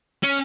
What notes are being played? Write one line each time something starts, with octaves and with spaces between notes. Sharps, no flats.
C#4